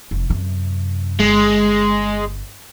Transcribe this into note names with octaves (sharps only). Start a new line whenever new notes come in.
F1
F#2 C3
G1 G#3